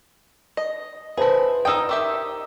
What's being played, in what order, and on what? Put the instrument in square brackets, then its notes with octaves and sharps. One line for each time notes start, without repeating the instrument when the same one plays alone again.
[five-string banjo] D#5
[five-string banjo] E4 G#4 [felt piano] B4 C5 A5
[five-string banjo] D#4 G5 [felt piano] D#6 E6
[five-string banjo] D#3 G4 E5